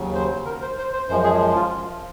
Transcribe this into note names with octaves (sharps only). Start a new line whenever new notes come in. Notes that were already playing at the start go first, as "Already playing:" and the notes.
Already playing: D#2 C#3 F#3
C5
A#4
C5
C5
C5
F#2 F3 G#3 C5
G#4
F4